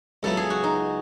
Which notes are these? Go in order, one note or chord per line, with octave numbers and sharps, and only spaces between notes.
C#2 C#3 F#3 B3 E4 A4
G#4
F#4
D#4